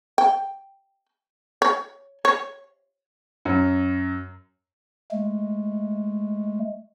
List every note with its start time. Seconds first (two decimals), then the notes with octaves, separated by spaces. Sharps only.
0.18 G5
1.62 C#5
2.25 C#5
3.45 F#2
5.11 G#3 A3